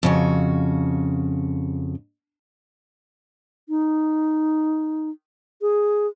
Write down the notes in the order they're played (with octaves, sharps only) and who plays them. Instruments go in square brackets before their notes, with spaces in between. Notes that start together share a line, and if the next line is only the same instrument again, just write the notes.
[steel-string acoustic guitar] F2 C#3 F#4
[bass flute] D#4
G#4